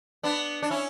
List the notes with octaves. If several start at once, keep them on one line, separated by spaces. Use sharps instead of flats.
B3 D4
D4
C#4 E4